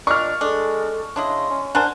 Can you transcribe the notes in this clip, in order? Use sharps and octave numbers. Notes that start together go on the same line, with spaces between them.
A#2 D4 D#5 C#6 F6
G#3 D4 A4
C#3 D4 E4 D#5 C6
C#4
D4 A#4 C5 F#5 G#5 C6